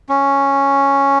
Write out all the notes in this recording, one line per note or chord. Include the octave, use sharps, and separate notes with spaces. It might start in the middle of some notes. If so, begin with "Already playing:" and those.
C#4